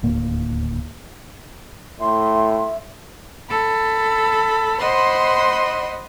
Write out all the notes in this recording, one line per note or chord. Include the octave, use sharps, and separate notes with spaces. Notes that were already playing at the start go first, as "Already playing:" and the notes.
D#1 D2 A2 A#3
A2 E5 C6
A4 B5
C5 D#5 F#5 B5 C6